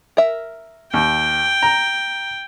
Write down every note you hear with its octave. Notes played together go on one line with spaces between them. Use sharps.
A#4 E5
D#2 G5
A#5